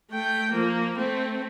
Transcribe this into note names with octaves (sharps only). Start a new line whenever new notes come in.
A3 G5
F3 A#3
A3 C4